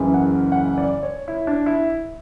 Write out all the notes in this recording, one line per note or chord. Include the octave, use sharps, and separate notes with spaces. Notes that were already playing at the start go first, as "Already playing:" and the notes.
Already playing: F#1 F#2 C#3 E3
F#5
F#5
D5
C#5
E4
D4
E4